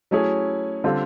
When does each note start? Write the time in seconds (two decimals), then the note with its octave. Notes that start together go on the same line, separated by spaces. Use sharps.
0.11 F#3 A3 C#4 E4 G#4
0.84 D3 G3 C4 F4 A4